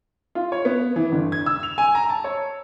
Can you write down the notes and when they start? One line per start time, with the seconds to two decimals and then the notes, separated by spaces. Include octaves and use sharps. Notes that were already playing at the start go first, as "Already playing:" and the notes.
0.35 F4
0.52 C#5
0.65 B3
0.96 E3
1.12 G1
1.32 G#6
1.46 E6
1.63 F7
1.78 G#5
1.95 A#5
2.10 A5
2.24 C#5